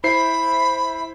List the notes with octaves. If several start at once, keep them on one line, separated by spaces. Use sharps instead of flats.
E4 C5 E5 B5 C7